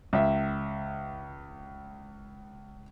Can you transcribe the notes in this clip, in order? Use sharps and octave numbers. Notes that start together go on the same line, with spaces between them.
C#2 E5